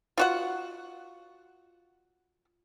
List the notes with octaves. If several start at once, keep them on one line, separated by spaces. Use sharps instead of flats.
F4 F#4 F#5